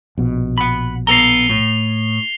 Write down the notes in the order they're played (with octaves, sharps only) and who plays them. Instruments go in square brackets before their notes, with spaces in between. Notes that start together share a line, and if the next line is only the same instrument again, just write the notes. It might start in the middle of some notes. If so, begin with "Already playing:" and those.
[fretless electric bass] A#1 B2
[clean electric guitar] F#5 B5
[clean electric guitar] B3 A4 A#5 [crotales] C7 F7 G7
[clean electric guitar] A2